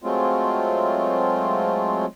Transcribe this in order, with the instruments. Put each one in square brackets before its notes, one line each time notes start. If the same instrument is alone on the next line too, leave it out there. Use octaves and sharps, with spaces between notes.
[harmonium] F#3 G#3 A3 C4 F4